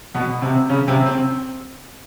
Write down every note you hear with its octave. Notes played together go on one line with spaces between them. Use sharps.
B2 B3
C3 C4
C#3 C#4
C3 C4
C4